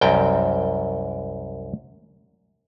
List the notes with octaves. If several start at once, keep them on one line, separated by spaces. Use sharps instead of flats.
C2 F#2 G5